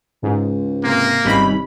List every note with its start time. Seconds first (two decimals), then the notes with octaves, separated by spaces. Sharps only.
0.23 C#2 G#2
0.84 C3 A#3
1.25 G#1 C3 G3 C#4 D#4 B5